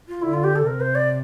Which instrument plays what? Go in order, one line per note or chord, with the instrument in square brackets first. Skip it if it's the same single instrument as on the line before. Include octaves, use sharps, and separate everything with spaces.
[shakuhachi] F4
[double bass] D3 [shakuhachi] E4
[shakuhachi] F4
G4
A4
[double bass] C3 [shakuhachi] A#4
[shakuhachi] C5
D5